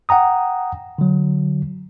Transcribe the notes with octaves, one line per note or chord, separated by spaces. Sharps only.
F#5 G5 A#5 D#6
D3 F#3